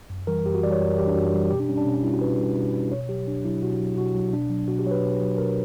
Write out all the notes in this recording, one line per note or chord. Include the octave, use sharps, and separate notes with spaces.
F#2
E3 G3 A#4
F#2 G4
F#4
E3 G3 D5
C#5
F#2
A#4
E3 G3 G4
D4
F#2 F#4
E3 G3
B2 G4
D4
G3 C#4
D4
B2 C#4
D4
G3 E4
F#4
B2 B4
G3
B2
G3
B2 C#5
F#3 G4
B2 D4
F#3 E4
B2 F#4
F#3
B2 F#4
F#3
B2 D4
F#3
B2 F#4
G4
F#3 C#5
B4
B2
F#3
B2 A#4